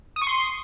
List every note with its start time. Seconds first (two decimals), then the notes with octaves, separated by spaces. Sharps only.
0.16 D#6
0.21 C#6
0.27 C6